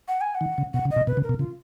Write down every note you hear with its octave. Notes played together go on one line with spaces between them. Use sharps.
F#5
G#5
F#5
D#3
C#3
B2 F#5
C#3
D#5
B2
B2 B4
C#3
A#4
B2
C#3 F4